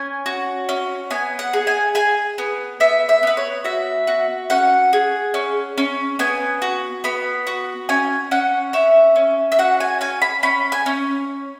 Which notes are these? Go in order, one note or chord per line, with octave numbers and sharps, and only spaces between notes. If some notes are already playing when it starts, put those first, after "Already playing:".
Already playing: C#4 G#5
F#4
C#4
B3 G#5
F#5
G#4
G#5
G#4 G#5
B3
B3 E5
E5
B3 B4
C#5
F#4 E5
F#4
C#4 F#5
G#4
C#4
C#4
B3 G#5
F#4
B3 B5
F#4
C#4 G#5
C#4 F#5
C#4 E5
C#4
E5
F#4 F#5
G#5
C#4 G#5
B5
C#4 B5
G#5
C#4